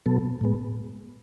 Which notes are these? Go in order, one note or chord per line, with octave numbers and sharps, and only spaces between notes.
B2 F#3 B3 A4
A2 G#3 B3